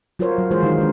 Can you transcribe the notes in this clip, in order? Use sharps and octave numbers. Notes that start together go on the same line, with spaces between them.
F#3 F4 F#4 A#4 C5 C#5
F#3
E3 G#3 F4 G#4 C5
D#3 D#4
G#3 D4